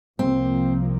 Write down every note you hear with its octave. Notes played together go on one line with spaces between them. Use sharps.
C2 C3 F3 A#3 C4